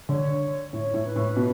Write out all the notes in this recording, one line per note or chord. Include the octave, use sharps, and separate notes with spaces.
D3 C#5
A2 C#5
A2
B4
A2
B2